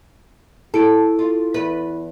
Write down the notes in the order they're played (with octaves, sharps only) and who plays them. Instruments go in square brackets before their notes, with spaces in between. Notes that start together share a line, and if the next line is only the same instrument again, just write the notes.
[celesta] E4 D7 [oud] A4
[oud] F4
E2 B4